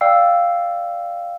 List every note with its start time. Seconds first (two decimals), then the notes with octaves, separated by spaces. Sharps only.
0.01 D5 F5 G5 E6 C7